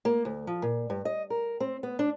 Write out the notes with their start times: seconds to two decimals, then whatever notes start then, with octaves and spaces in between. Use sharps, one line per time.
0.05 A#3
0.25 D2
0.47 F3
0.62 A#2
0.90 G2
1.05 D#5
1.30 A#4
1.60 C4
1.83 B3
1.99 D4